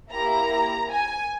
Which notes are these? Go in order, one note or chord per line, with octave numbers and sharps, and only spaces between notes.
A#3 E4 G4 A#5
G#5